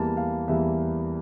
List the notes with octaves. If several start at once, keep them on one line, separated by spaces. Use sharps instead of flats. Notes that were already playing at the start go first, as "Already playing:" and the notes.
Already playing: E2 E3 G3 A#3 A5
F5
E2 E3 G3 A#3 E5